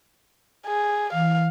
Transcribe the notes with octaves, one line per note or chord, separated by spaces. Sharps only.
G#4
E3 F5